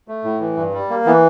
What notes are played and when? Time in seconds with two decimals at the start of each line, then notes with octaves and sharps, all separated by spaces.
0.08 A3
0.24 A2
0.41 E3
0.57 G2
0.73 G3
0.90 A#3
1.06 E3 B3